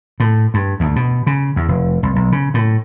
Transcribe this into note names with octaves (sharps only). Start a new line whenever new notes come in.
A2
G2
D2
B2
C#3
E2
F1
C2
B1
C#3
A2